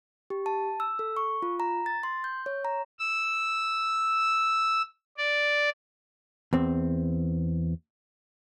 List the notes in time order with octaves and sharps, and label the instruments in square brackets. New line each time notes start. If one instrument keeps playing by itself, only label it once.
[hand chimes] G4
A5
E6
A4
C#6
F4
A#5
A6
C6
G6
C#5
A#5
[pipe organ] E6
D5
[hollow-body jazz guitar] E2 C4